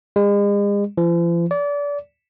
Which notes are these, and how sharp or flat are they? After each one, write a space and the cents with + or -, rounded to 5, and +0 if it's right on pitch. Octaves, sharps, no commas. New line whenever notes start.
G#3 -40
F3 -45
D5 -30